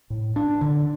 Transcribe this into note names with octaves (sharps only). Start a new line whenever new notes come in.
A2
D4
D3